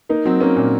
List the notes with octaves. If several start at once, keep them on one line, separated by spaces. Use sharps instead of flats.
A#3 D#4
F#3 C4
A#3 C#4
A#2